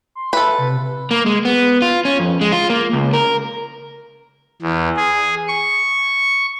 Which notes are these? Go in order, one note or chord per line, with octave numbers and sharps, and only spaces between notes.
C6
A4 B4 E5
C3
A#3
G#3
B3
F4
C#4
F2
G#3
F4
A#3
C#2
A#4
E2
G#4
C#6